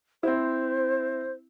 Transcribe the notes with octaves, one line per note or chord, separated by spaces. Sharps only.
C4 E4 C5